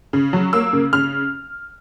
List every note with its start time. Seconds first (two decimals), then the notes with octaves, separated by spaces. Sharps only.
0.13 C#3
0.33 F#3
0.53 A#3 E6
0.73 C#3
0.93 C#3 F6